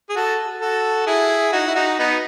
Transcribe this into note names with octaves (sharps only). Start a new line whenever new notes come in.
G#4
F#4 A4
F#4 A4
E4 G#4
D#4 F#4
E4
D#4 F#4
B3 D#4